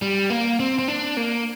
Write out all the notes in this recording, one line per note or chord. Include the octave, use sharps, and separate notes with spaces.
G3
A#3
C4
C4
D4
A#3